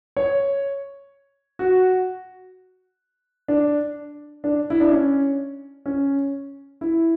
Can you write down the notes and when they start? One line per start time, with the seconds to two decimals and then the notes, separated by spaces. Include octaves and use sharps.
0.17 C#5
1.59 F#4
3.48 D4
4.44 D4
4.70 E4
4.80 D4
4.91 C#4
5.86 C#4
6.81 E4